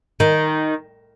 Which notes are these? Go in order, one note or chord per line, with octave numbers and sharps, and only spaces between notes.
D#3